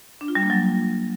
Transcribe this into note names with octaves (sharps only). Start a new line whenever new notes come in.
D4
F4
G3
A#3
F#3